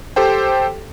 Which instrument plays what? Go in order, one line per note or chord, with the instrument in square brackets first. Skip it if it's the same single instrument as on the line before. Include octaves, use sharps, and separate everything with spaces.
[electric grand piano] G4 A4 C5 G5